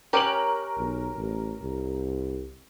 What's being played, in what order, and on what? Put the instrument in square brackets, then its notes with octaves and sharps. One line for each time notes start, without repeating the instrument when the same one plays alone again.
[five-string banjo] C#4 G4 C#5 [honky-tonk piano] A#4 D7 F#7
[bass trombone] B1
A1
C2